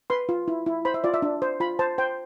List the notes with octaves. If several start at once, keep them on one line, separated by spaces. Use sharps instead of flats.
B4 C6
F4
E4
E4
C5 B5
E5
F4 D5
E5
D4
C5
F4 B5
C5 A5
C5 G5